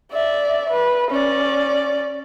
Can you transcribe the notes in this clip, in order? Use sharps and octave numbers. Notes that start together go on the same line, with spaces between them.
D5 E5
B4
C#4 D5